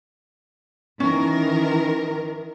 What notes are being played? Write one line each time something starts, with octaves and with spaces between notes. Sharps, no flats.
D#3 E3 C#4 A#4